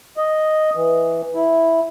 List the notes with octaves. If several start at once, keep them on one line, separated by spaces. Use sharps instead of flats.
D#5
E3
E4